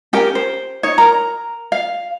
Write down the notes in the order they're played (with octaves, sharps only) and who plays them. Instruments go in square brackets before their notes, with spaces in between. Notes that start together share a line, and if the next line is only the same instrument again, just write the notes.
[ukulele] C#4 G4 A#4 G5
C5
D#4 C#5
A#4 A#5
F5